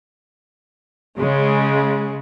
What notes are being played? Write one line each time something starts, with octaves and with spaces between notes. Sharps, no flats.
C#3 G#3